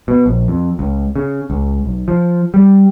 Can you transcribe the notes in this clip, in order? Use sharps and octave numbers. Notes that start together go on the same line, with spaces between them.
B2
A#1
F2
C#2
C#3
C#2
B1
F3
G3